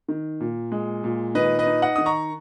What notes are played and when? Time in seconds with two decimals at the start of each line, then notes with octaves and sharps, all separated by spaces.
0.08 D#3
0.40 A#2
0.72 G#3
1.04 A#2
1.35 D#3 B4 D#5
1.59 B4 D#5
1.66 D#4
1.82 D#5 F#5
1.96 D#3 D#6
2.06 A#5 C#6